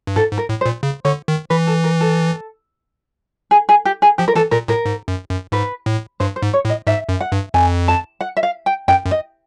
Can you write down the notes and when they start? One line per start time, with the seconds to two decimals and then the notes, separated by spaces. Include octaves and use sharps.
0.07 G2
0.16 G#2 A4
0.33 G#2
0.38 A#4
0.49 A2
0.61 C5
0.66 A#2
0.83 C#3
1.05 D3 C#5
1.28 D#3
1.50 E3 B4
1.67 A4
1.84 A#4
2.01 A4
3.51 G#4
3.69 G#4
3.85 G4
4.02 G#4
4.18 F3 G4
4.28 A#4
4.35 E3 A4
4.51 A#2 A#4
4.68 A2 A#4
4.86 G#2
5.08 F#2
5.30 F#2
5.52 G#2 B4
5.86 A2
6.20 G2 C5
6.36 C5
6.42 G#2
6.53 C#5
6.65 A2
6.69 D#5
6.87 G#2 E5
7.09 F#2
7.21 F#5
7.32 G2
7.54 F2 G#5
7.88 A5
8.21 F#5
8.37 E5
8.43 F5
8.66 G5
8.88 F#2 G5
9.05 F#2
9.11 D#5